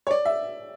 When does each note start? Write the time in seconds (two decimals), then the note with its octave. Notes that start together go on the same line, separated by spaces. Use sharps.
0.07 C#5
0.11 D5
0.25 E5